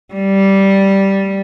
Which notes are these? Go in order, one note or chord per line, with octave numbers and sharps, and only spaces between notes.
G3